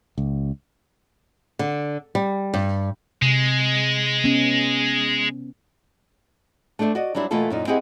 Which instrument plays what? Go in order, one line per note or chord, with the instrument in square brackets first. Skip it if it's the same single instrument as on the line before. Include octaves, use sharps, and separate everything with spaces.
[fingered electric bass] C#2
[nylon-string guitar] D3
G3
G2
[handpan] C3 [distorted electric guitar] G#3
[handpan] B3 C#4
[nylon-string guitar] A3 D4 C5 D5 E5
F#4 D5 D#5
F#3 G3 D4 E4 C5
B2 E3 A3 A#3 F4 A4
F#2 A#2 D#4
C4 E4 G4 G#4 D#5 F#5